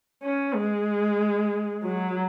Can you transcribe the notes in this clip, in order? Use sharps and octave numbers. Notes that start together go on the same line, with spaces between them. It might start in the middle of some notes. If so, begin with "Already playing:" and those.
C#4
G#3
F#3